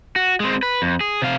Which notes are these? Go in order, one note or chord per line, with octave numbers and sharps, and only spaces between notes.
F#4
G#3 C4
B4
F2
G#4
C3 F5